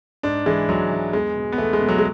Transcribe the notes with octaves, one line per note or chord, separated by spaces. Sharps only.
G#2 D4
E3 G#3
G#2 F#3
E3
E2 G#3
B2
B3
E2 A3
G#3
B2
F#3
G#3